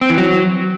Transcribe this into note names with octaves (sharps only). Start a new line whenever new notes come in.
C4
E3
F#3